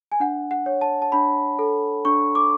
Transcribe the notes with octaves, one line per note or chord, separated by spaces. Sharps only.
G#5
D4 F#5
F#5
C#5
A5
A5
D4 B5
A4
D4 C#6
D6